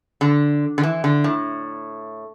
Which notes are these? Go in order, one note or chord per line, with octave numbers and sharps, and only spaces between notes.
D3
D3
E3
D3
A2